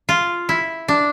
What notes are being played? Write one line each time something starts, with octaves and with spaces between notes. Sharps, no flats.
F4
E4
D4